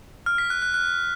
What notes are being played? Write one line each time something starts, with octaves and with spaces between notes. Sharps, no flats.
F6
B6
F#6
F#6
F#6